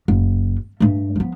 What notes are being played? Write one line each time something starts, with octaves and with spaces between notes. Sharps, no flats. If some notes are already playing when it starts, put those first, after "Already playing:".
F#1
G2 A3
F3 B3